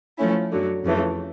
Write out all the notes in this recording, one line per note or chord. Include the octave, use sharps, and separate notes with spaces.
F3 A3 C#4 E4
F#2 D3 F#3
F2 C#3 E3 A3